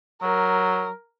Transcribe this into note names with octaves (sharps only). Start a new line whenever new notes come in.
F#3 A#4